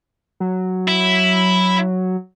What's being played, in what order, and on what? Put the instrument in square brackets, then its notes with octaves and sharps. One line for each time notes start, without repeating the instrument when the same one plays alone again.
[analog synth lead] F#3
[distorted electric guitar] E4